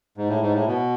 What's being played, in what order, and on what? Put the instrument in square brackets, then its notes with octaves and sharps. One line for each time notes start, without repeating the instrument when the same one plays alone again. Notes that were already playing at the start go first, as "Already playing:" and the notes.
[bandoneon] G#2
A2
G#2
A2
B2